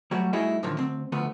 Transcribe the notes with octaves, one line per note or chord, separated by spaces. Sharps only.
F#3 G3 A3 F#4
G3 A3 D#4 E4 F#4 G#4
A2 D3 D#3 F3
D2 C4
D2 F3 A3 B3